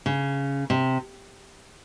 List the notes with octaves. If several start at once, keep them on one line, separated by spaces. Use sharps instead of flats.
C#3
C3